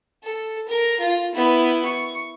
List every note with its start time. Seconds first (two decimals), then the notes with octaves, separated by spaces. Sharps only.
0.23 A4
0.68 A#4
1.00 F4
1.35 B3 E4
1.85 C#6